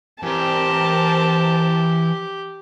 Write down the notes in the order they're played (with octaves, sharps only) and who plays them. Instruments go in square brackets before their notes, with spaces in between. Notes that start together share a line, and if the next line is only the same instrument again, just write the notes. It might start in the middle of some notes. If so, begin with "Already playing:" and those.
[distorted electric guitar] E3 A#5 [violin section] C4 A#4 [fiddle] G4 [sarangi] A5